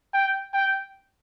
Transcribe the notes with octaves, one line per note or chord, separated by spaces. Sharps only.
G5
G5